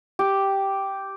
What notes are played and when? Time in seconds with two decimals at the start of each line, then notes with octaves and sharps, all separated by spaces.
0.19 G4